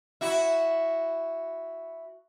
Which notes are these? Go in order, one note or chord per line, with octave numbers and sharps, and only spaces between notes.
E4 F#4